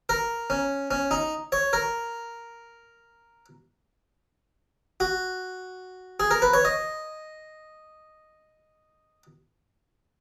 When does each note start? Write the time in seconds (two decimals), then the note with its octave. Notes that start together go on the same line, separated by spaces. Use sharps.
0.09 A#4
0.50 C#4
0.91 C#4
1.11 D#4
1.52 C#5
1.73 A#4
5.00 F#4
6.20 G#4
6.31 A#4
6.42 B4
6.53 C#5
6.65 D#5